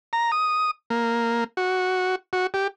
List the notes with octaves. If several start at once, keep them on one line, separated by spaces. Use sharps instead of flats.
A#5
D#6
A#3
F#4
F#4
G4